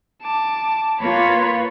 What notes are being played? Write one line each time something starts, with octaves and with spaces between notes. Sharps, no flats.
A5 D6
A#3 F4 B4 C#5 B5